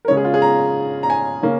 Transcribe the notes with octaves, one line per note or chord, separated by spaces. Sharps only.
A#4
C#3 G#3 C#4 C#5
G#4
F4
G#4
A#5
A#5
G#5
C#3 A#3 C#4